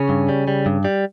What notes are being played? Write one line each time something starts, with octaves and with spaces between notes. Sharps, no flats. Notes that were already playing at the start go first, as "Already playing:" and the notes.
Already playing: C#3 C#4
G2
G3
G3
G2
G3